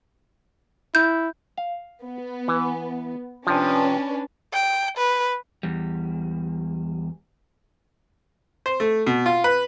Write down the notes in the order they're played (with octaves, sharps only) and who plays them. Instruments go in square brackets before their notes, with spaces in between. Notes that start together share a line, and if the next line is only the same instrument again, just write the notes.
[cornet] E4 [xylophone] G6
[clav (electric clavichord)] F5
[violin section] B3
[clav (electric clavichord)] E3
[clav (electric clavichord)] C3 F3 [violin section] C#4 D4 B4
[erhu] G5
B4
[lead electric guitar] E2 G3
[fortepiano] C5
A3
B2
F4
B4